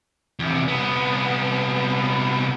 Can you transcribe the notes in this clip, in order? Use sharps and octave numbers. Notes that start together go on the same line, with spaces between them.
E2 C3
C2 B3